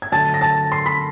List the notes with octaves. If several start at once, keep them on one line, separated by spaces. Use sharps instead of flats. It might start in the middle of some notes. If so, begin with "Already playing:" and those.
G#6
D3 F#3 A3 A5 A6
A#6
A5 A6
C6 C7
B5 B6